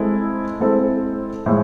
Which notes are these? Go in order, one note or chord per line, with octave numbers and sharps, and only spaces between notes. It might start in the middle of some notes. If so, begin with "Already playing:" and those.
Already playing: G#3 C4 E4 A4
G#3 C4 E4 A4
A2 F3 G#3